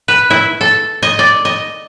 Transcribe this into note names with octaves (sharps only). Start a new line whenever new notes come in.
B4
E4
A4
D#5
D5
D#5